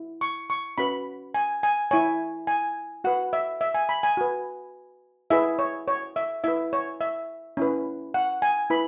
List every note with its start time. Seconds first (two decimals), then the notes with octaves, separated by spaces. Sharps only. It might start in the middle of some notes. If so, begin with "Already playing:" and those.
Already playing: E4
0.21 C#6
0.50 C#6
0.78 C#4 F#4 B4 B5
1.34 G#5
1.63 G#5
1.91 E4 C#5 G#5
2.47 G#5
3.04 F#4 B4 F#5
3.33 E5
3.61 E5
3.75 G#5
3.89 B5
4.03 G#5
4.17 F#4 B4
5.30 E4 G#4 B4 E5
5.59 C#5
5.88 C#5
6.16 E5
6.44 E4 B4 E5
6.73 C#5
7.01 E5
7.57 C#4 E4 B4
8.14 F#5
8.42 G#5
8.70 E4 B4 B5